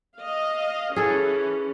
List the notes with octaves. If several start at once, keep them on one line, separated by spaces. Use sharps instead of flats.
D#5 F5
E3 C#4 G#4 A4